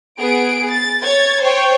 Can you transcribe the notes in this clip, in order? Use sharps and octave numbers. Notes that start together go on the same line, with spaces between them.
B3 G#4 D7
A6
C#5 G#6 A6
C5 C#5 G5